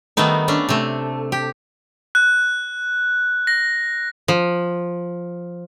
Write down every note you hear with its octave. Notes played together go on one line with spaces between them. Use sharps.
D#3 G3 A3 B3 D#4
A3 C#4 D4
C3 A3
G4
F#6
A#6
F3